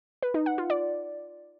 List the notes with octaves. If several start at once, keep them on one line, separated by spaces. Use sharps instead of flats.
B4
D#4
F#5
F4
D5